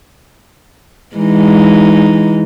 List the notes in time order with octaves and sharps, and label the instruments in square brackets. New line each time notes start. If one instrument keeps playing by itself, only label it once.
[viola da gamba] E3 G#3 D#4